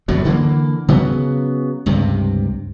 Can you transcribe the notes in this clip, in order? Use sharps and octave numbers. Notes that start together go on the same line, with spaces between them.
G1 F#2 A2 F#3
D3 E3 A3 A#3
C#3 F#3 B3
C#2 G2 C3